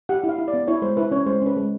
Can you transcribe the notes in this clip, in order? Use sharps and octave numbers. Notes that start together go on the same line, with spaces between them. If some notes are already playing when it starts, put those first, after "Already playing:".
G4 F#5
E4
F5
E4
D5
B3
E4 C#5
G#3 C5
E4 B4
C#4 C#5
G#3 C5
C#4 B4
G#3